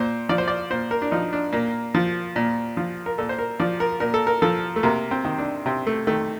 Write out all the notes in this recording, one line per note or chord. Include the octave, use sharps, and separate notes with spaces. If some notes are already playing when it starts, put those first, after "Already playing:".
Already playing: A#2 C5
F3 D5
C5
D5
A#2 C5
A#4
D4
F3 D#4
D4
A#2 A#3
F3
A#2
F3
A#4
A#2 A4
C5
A#4
F3 D5
A#4
A#2 A#4
A4
A#4
F3 A4
A3
C3 A#3
C4
D#3
D4
C3 C4
A3
D#3 A3